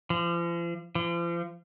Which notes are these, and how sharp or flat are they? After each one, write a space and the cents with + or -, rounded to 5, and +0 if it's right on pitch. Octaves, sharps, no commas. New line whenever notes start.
F3 -40
F3 -40